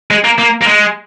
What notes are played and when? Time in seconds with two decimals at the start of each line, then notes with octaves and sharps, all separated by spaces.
0.11 G#3
0.24 A#3
0.38 A#3
0.61 A#3
0.66 G#3